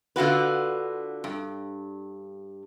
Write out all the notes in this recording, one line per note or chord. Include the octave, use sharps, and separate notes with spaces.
D3 F4 F#4 B4
G2